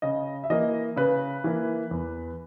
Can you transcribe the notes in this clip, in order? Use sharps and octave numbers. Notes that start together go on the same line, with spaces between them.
C#3 D#5
E5
E3 A#3 D#5
C#3 B4
E3 A#3
E2